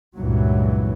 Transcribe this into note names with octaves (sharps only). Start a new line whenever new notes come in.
C#2 G2 A#2 E3 F#3